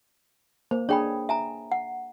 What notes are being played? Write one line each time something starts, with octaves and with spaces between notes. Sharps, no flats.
A#3 C5
D4 G#4 C#5 G5 B5
E5 G#5 A#5
F#5